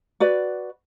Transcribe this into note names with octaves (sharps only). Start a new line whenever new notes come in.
F#4 B4 D5